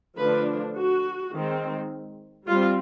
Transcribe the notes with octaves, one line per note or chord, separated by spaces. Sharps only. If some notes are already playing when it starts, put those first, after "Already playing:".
D3 F3 A3 D4 B4
F#4
D#3 G#3 C4
G3 C4 F4